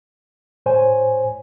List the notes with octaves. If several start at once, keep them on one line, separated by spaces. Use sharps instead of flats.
A2 C5 C#5 G#5